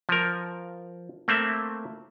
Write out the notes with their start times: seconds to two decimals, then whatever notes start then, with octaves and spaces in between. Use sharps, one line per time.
0.09 F3 A#4
1.28 A3 A#3 C4 E5